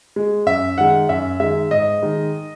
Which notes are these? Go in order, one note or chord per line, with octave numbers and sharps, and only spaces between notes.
G#3
F#2 E5
D#3 G#3 F#5
F#2 E5
D#3 G#3 E5
G#2 D#5
D#3 G#3